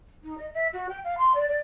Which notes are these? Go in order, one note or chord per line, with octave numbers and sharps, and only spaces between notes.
D#4
D#5
E5
F#4
G5
F5
C6
D5
D5